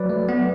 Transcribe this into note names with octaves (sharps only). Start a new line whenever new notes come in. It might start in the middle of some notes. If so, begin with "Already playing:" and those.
Already playing: F#3 B4 D5
A3
B3